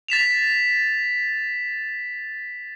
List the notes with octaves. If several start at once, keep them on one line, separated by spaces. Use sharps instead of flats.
A6 B6 E7 F7